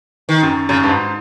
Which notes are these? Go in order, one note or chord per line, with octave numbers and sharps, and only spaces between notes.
D#3
F#2
F#2 C#3
G2
G#2